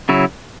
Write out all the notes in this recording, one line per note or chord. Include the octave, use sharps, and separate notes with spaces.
C#3 F#3 E4